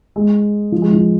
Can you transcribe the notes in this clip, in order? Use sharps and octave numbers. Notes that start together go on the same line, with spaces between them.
G#3
F3
G#3
F3